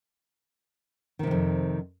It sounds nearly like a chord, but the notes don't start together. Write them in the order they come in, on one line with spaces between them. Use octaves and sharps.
D#3 C3 G#2 F2